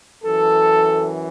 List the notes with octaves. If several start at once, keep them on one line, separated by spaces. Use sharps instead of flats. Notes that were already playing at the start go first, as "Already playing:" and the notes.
F#2 E3 A4